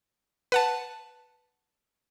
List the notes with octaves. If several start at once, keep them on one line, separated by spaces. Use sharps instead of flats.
B4 F#5 A5